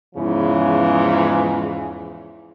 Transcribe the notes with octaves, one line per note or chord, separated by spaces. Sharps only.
E2 G#2 C#3 E3 F3